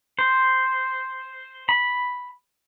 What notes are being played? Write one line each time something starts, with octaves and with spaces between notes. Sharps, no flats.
C5
B5